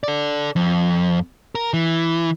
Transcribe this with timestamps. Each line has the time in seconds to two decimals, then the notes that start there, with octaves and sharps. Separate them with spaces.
0.03 A4 D5
0.56 F2
1.55 A#4
1.73 E3